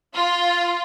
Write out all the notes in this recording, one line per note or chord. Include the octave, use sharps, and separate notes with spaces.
F4